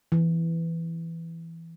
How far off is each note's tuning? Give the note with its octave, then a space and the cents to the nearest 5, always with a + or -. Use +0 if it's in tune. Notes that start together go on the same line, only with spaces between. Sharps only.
E3 +5